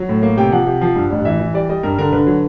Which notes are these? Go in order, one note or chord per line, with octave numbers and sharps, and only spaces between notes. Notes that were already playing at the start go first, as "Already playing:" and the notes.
Already playing: F#3
A2
A#3
C3 G5
F3 F#5
C3
F3
G2
A1
E3 E5
E3
G3 D5
G3 D#5
G2 A#4
D3 A#4
D3 B4
F#3